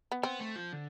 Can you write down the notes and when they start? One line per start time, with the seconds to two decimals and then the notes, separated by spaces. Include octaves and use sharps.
0.12 B3
0.23 B3 C4
0.40 A3
0.56 F3
0.72 D3